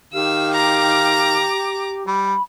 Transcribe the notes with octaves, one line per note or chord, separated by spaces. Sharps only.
D#3 G4 F5 E6
A#5 D6
G3 B5